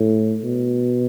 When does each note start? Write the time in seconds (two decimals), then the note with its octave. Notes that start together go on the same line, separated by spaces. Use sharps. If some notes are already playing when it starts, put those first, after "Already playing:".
Already playing: A2
0.44 B2